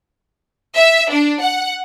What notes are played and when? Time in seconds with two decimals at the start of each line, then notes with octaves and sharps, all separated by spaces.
0.76 E5
1.11 D4
1.42 F#5